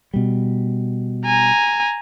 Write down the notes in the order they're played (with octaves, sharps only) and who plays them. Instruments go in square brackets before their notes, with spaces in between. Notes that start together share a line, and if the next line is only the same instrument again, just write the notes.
[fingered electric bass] B2 G3
[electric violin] G#5 A#5